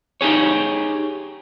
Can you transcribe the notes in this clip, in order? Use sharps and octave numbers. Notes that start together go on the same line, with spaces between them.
D#4 G4 G#4 C#5